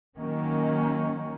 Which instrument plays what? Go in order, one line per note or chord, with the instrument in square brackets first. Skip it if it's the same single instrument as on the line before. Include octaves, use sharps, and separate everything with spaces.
[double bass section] D#3 F#3 A#3 C#4